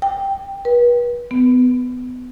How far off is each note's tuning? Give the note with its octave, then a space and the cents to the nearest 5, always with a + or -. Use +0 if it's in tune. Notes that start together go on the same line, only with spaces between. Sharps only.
G5 +10
B4 -40
B3 +25